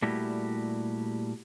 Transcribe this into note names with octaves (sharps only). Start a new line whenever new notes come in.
A#2 G3 A3 E4 F#4 G4